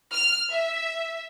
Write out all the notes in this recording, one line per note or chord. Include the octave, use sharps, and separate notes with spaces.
F6
E5